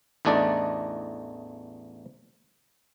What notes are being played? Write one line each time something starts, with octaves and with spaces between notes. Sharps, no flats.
A1 E2 A3 D4 D#4 D5